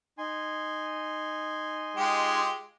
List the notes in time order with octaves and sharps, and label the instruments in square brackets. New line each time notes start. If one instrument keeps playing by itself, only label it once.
[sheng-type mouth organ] D#4 G#5 C6
[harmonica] G#3 F4 G4